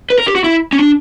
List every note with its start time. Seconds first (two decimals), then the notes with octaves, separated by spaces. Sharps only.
0.10 B4
0.18 A#4
0.27 G4
0.35 F#4
0.44 E4
0.73 C#4
0.79 D4